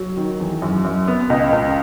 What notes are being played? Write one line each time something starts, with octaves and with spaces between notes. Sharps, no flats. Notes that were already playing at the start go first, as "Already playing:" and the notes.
Already playing: F#3
D#3
E2
F#2
F#2
B3
C#2 D#5
C#2